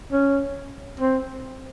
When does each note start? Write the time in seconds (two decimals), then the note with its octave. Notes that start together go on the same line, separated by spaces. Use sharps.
0.12 C#4
1.00 C4